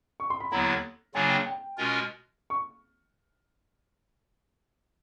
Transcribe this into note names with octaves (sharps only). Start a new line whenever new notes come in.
C#6
C6
B5
D#2 D3 F#3 B3 E4 A#5
C#3 F#3 A#3 D4 F4 G#5
G5
G5
B2 G#3 C#4 F4 A#4
C#6